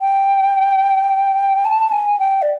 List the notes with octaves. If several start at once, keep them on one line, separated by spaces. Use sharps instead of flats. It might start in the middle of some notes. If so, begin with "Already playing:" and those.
G5
A5
G#5
G5
D5